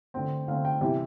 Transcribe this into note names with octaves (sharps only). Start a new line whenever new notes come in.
D3 A3 C4 G5
D3 A3 C4 F5
G5
C3 E3 G3 E5